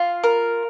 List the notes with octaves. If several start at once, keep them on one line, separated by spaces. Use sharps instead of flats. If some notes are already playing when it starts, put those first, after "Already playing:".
Already playing: F4
A#4